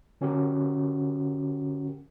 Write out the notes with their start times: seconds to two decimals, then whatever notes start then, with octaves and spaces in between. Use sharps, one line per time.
0.21 D3 C#4 F#4 G4 A#4